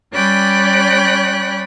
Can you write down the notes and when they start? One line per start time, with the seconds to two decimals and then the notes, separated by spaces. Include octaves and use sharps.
0.13 G3 C#4 D5 G5 B5 F#6